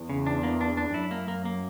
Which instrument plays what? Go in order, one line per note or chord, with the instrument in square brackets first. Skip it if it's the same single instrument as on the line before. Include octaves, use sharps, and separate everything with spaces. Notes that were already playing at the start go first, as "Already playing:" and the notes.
Already playing: [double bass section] E2
[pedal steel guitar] C#3
D4
A#3
D4
D4
[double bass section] F#2 [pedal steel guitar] E4
[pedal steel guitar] A#3
A#3
A#3